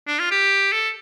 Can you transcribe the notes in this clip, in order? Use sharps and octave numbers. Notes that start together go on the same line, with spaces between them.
D4
F4
G4
A4